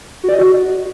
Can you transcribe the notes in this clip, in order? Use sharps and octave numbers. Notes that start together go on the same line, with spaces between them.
F#4
D5
D#5
F#4